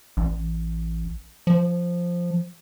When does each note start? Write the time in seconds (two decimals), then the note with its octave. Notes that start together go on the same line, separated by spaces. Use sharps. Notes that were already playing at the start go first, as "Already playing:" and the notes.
0.17 A1
1.47 F3